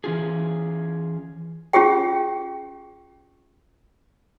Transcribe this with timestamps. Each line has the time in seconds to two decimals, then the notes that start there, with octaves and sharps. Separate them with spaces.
0.04 E3 C#4 F4 G#4
1.73 C#4 F4 G4 G#4 G5